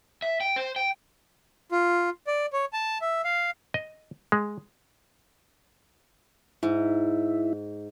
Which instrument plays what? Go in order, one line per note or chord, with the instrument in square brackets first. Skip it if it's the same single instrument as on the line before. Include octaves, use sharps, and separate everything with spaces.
[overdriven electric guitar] E5
G5
C5
G5
[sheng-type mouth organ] F4
D5
C#5
A5
E5
F5
[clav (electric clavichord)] D#5
G#3
[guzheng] G#2 [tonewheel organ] E4